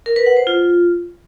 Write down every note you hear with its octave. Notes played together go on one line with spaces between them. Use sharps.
A#4
B4
F#5
C5
F4